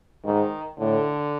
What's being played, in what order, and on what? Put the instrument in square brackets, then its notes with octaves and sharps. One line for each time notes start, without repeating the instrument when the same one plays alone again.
[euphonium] G#2 [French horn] D#3
[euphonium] A2 [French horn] D3